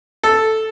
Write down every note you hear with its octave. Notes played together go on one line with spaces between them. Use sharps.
A4